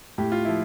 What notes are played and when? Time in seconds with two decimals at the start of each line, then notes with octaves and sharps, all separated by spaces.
0.18 A2 G4
0.32 F4
0.45 F3 E4